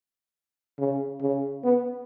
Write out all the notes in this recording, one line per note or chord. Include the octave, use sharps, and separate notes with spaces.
C#3
C#3
B3